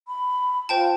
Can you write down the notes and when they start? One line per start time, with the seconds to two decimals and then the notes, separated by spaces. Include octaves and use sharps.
0.07 B5
0.69 F4 C5 G5 A5